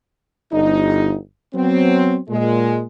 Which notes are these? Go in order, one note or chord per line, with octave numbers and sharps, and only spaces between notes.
G1 D#4
F#3 B3 C4
A#2 G#3